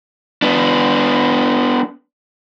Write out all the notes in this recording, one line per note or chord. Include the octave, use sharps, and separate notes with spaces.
B3 D4